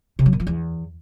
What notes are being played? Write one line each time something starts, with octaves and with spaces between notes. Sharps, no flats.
C3
F#3
A#2
F3
E2